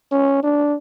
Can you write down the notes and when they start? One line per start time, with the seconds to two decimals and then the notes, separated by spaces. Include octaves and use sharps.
0.12 C#4
0.43 D4